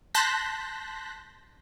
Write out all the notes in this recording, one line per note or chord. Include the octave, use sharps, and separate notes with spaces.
A5 C6 F#6 G6 A#6 B6